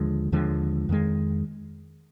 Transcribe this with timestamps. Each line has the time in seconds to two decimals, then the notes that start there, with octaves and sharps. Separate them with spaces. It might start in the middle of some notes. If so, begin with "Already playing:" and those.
Already playing: D#2 D3 F3 G#3
0.32 D#2 D3 F3 G#3
0.89 F2 D#3 G#3